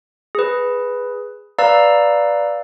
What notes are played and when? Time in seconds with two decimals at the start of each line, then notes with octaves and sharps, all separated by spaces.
0.35 G#4 B4
1.58 B4 D5 F5 A#5 E6